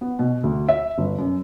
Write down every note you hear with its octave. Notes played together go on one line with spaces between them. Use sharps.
B3
B2
D2
E5
G1
F#2